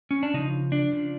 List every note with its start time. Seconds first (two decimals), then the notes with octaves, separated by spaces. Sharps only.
0.11 C#4
0.23 D4
0.34 C#3 F3 D#4
0.72 D4
0.92 C#3 F3